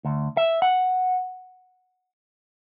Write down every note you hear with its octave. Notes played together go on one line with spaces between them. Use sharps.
D2
E5
F#5